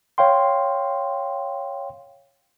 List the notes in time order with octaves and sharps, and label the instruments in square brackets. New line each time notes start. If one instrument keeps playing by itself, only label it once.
[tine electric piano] C#5 F5 G5 C6